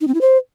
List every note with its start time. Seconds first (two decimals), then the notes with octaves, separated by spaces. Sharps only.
0.01 D#4
0.08 C4
0.14 E4
0.21 C5